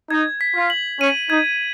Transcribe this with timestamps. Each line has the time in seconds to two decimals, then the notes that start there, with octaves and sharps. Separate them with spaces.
0.10 D#4 G#6
0.41 B6
0.56 F4
0.70 F#7
1.00 C#4 D#7
1.30 D#4 G#6